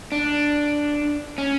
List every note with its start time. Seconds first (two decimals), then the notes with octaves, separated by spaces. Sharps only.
0.12 D4
1.38 C#4